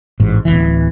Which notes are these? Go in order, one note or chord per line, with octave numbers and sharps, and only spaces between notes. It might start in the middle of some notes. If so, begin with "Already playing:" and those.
A1 G#2
D1 G1 E3